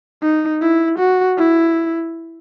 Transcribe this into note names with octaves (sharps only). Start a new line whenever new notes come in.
D#4
E4
F#4
E4